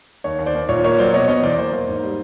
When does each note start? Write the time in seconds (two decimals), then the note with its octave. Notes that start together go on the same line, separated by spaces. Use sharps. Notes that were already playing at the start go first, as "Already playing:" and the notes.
0.24 D#2 C#5
0.39 D#2
0.46 C5 D5
0.54 D#2
0.69 A#2 C#5
0.84 A#3 C#5
0.98 F#3 C5 D5
1.13 B2 C#5 D#5
1.28 B3 C#5 D#5
1.43 E2 C5 D5
1.58 A#3 C5
1.73 A#3
1.88 G#2
2.03 G3